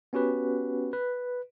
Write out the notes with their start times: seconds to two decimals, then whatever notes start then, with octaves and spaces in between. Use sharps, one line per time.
0.13 B3 C#4 F#4 G4 B4
0.93 B4